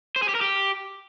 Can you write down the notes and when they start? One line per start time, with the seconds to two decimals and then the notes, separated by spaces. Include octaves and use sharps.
0.16 C5
0.22 G#4
0.29 G4
0.35 A#4
0.41 G4